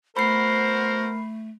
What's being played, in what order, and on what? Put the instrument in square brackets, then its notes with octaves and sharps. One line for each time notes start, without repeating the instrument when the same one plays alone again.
[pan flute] A3 [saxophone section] B3 F#4 C5 [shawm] A#4 [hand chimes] B5 C7